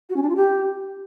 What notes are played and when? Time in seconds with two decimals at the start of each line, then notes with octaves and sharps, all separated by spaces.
0.10 F#4
0.16 C#4
0.23 D4
0.29 F4
0.36 G4